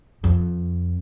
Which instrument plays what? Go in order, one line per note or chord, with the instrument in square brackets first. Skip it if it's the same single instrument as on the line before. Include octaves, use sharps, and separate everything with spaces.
[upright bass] F2